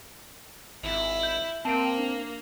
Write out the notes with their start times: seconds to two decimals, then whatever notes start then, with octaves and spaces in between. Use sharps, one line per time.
0.83 G#1 E4
1.23 G6
1.65 A#3 C4 A5 D7
1.98 D4